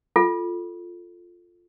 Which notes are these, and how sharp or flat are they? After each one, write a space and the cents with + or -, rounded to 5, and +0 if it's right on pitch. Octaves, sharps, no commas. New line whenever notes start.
F4 +0 A4 +0